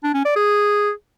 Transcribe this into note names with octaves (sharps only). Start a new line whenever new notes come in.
D4
C#4
D5
G#4